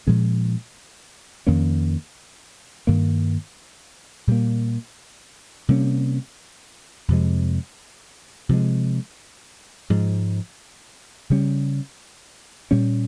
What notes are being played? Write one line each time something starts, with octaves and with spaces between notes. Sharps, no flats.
A#2 F3 G#3 C#4
F2 D#3 A#3 C#4
G2 D#3 A#3
A#2 G3 A#3
C3 G3 A#3 C#4
F2 C3 F3 G#3
C3 F3 G#3
G#2 F3 G#3
C#3 G3 C#4
A#2 G3 C#4